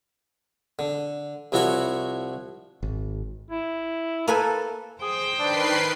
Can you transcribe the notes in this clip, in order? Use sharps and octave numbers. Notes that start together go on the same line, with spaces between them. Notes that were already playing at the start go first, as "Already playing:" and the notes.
D3
C2 F3 E4 F#4 C#5 B5
G#1
E4
A#3 A4 B4 G#5
G#4 C5 G5
D#3 D4 B4 C7